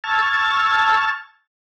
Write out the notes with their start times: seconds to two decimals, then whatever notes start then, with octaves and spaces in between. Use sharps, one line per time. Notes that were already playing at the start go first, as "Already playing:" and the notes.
0.04 A5 C#6 E6 F6 G#6 A6